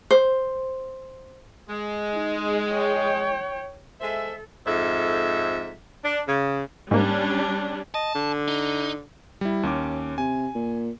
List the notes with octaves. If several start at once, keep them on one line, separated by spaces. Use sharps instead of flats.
C5
G#3
D#4
C#5 G5
G#3 A4 C5 E5
F2 G#2 A4 E5
D4
C#3
G#2 G3 A#3 C#4 D4
D#5 A5
D3
D#4
G3 E4
D#2 C#4 D6
C3 G#5
A#2